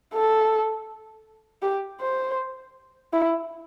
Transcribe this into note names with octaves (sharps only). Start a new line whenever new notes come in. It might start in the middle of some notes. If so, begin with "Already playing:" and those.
A4
G4
C5
E4